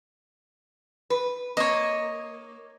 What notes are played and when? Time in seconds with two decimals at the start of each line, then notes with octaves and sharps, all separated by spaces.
1.10 B4
1.57 A#3 C#5 D#5